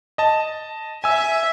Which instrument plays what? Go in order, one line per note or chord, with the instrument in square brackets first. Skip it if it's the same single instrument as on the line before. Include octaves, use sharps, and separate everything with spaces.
[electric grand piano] D#5 A5
[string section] E5 [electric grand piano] G#5 E6